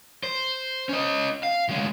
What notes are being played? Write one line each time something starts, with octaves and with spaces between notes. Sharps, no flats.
C5
C#4 D#5
F5
D2 G#3